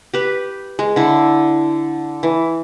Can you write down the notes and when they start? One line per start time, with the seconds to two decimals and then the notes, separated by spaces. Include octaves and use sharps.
0.14 G4 B4
0.79 G#3
0.96 D3 E4
2.23 E3